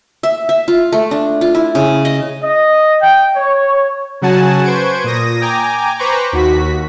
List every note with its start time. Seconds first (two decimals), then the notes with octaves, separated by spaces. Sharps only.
0.23 E5
0.49 E5
0.68 F4
0.92 A3
1.11 D4
1.41 F4
1.55 E4
1.75 C#3
2.05 D#5
2.41 D#5
3.02 G5
3.35 C#5
4.21 C#3 F#3 F#4 F#5 G#5 A5
4.64 B4 C5 C#6 G#6 D7
5.04 A#2 D#6 A#6
5.41 G5 G#5 A#5 D6
5.99 B4 C5 A#5 B5 C#6 D6
6.32 D#2 F#4 B6